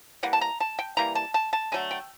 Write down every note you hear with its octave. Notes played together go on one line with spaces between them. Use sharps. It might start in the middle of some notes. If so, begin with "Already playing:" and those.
E3 G3 A#3 F#5
A5
A#5
A5
G5
E3 G3 A#3 A#5
A5
A5
A5
D3 F#3 A3 G#5
G5